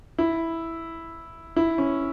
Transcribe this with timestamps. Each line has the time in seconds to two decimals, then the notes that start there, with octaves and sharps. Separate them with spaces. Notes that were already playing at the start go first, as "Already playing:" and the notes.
0.19 E4
1.56 E4
1.78 C#4